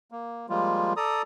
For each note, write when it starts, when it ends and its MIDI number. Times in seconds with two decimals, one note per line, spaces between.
0.12 0.46 58
0.49 0.93 53
0.49 0.93 55
0.49 0.93 56
0.49 0.93 58
0.49 0.93 65
0.97 1.22 69
0.97 1.22 74
0.97 1.22 82
0.97 1.22 87